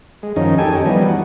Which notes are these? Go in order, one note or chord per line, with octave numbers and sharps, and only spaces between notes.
G#3
F#2 D#3 F3 C#4 D#4
G4 A4 G#5
C#4 D#4
E3 F3 G3 B3 D#4
F#4